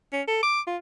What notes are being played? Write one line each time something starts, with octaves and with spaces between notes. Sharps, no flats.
C#4
A4
D6
F4